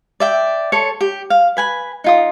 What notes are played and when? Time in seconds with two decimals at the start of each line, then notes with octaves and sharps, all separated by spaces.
0.20 D5 E5 G5
0.72 A4 C#5 C6
1.01 G4
1.30 F5
1.57 B4 G#5 B5
2.04 D#4 F4 D#6